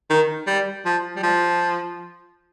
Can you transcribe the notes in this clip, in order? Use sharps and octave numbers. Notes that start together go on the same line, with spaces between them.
D#3
G3
F3
G3
F3